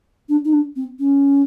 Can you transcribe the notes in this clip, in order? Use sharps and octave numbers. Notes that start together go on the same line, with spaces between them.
D4
D#4
D4
C4
C#4